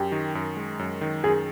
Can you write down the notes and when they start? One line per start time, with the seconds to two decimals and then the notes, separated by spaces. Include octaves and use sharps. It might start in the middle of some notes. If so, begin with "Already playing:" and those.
Already playing: F#2 G4
0.12 D#3
0.35 F#2
0.57 G#3
0.79 F#2
1.01 D#3
1.24 F#2 G#4